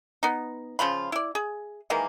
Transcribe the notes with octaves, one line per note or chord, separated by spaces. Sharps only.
B3 D#4
C#3 F3 F4 B5
E4 D5
G#4
D#3 E3 G#3 A#3